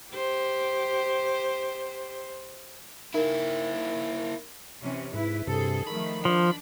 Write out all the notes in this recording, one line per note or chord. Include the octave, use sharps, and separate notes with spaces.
G4 C5
A#3 D#4 E4 A#4
C3 E3 C#4
G#2 E4 B4
G2 C3 G#4 A4
D#3 F3 A3 B5
F3 D4